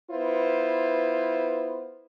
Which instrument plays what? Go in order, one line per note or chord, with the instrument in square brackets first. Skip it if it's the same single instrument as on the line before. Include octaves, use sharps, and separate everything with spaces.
[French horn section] B3 E4 F4 B4 C5